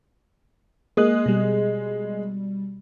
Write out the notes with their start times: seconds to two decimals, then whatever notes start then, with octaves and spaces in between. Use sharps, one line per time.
0.97 G#3 A#3 D#6 F#6
1.26 B2 G3